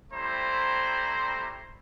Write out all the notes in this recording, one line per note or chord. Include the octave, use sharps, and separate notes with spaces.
G3 A3 C4 E4 C5 A#5